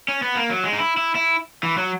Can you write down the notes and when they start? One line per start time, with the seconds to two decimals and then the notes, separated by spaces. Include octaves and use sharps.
0.08 C#4
0.22 B3
0.35 A#3
0.50 F#3
0.64 G#3
0.72 D#4
0.78 E4
0.97 E4
1.15 E4
1.63 E3
1.77 F#3